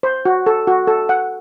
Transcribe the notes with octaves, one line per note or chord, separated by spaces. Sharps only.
C5
F#4
A4
F#4
A4
F#5